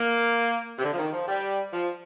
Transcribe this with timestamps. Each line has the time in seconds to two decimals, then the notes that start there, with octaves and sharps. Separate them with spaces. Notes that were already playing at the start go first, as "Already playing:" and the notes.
Already playing: A#3
0.79 C3
0.84 D3
0.94 F3
0.99 D#3
1.13 F3
1.28 G3
1.73 F3